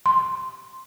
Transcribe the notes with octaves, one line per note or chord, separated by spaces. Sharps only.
C6